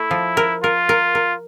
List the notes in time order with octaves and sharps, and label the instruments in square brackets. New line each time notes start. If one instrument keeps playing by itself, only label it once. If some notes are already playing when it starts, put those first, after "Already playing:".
Already playing: [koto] A3 [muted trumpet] E4
[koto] F3
A#4
[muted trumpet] F4 [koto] A#4
[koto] A#4
A#4